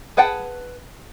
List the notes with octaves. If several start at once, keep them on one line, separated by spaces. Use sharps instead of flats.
G#4 B4 F#5 G5 A5